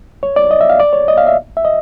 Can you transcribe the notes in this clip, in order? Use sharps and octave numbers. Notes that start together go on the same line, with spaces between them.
C#5
D5
D#5
E5
F5
D5
C#5
D#5
F5
E5
E5
D#5